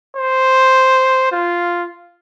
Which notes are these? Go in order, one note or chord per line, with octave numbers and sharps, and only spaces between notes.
C5
F4